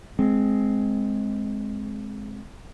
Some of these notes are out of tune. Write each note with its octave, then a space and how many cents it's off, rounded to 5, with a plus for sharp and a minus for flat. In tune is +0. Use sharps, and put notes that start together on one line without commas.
G#3 +15 C4 +0